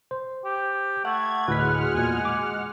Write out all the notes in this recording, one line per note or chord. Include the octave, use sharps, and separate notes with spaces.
C5
G4
A3 F#5 G#6
D2 A2 G#3 F#4 B4 F#5 F6 B6
E2 A#2 G#5
D6